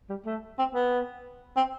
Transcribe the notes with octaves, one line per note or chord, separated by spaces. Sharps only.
G3
A3
C4
B3
C4